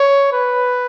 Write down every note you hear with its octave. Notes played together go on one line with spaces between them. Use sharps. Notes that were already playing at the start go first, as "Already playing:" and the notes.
Already playing: C#5
B4